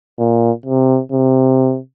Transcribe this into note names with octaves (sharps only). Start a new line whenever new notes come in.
A#2
C3
C3